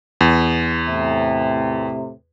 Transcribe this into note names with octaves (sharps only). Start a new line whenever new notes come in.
E2
A2 C3